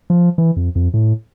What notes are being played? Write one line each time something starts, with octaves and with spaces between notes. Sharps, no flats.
F3
E3
F2
F2
A2